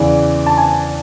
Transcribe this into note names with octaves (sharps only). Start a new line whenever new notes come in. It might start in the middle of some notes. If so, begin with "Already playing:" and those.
Already playing: E2 C#3 E3 D5
A5
G#5